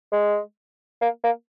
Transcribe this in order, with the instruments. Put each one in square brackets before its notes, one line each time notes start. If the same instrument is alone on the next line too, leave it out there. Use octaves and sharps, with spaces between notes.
[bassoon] G#3
A#3
A#3